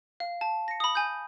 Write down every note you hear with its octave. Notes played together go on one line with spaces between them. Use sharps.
F5
A5
A#6 C#7
B5 D#6
G#5 G6